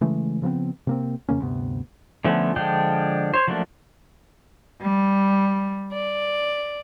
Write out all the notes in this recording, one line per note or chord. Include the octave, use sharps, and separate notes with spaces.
C#3 E3 G#3 A3
C#3 F3 B3 C4
C3 A#3 C4
F2 C#3 A#3 C#4
D2 G2 C3 B3
D3 F3 A3 B3 C#4
D3 F3 G#3 D4 G5
C5 C#5
F3 F#3 A3 A#3 D4
G3
D5